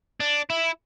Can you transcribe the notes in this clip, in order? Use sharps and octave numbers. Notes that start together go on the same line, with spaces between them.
D4
E4